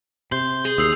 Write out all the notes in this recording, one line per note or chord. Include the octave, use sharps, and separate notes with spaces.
C3 C6 G6
G#4
D#2 D#6 E6 C7